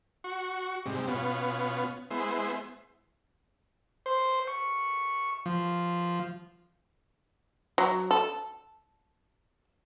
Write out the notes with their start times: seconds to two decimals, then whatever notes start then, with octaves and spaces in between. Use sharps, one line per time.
0.24 F#4 C#6
0.86 G#2 C3 G3
1.08 B2 B3 C#4 F4
2.10 G#3 B3 E4 C5
4.06 C5
4.47 C#6
5.46 F3
7.78 F#3
8.11 A4